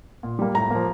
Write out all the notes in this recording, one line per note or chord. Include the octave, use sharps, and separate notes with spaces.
A#2
G3 A#3
A2 A#5
F3 A#3